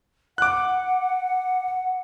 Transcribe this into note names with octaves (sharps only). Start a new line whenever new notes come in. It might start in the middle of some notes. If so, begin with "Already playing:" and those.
F#5 D6 F#6